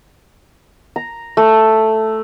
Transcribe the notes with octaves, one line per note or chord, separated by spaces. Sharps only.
A#5
A3